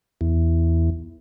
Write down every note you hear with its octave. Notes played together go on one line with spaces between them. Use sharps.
E2